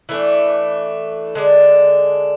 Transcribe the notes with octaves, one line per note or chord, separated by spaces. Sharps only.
E3 A3 D4
D3 G#3 D4